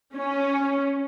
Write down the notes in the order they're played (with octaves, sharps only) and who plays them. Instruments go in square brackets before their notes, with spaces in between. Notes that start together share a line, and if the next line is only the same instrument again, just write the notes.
[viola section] C#4